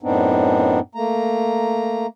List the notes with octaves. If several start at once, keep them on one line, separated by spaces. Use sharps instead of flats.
F#2 A2 B3 C4 D4 D#4
A3 A#3 A#5